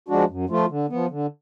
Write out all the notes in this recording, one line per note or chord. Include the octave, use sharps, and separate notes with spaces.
F3 G#3 D4 F#4
F#2
F3 A3 F4
D3
F3 B3
D3